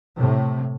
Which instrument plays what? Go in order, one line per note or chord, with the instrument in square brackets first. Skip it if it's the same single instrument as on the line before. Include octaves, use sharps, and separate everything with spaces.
[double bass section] A2 C3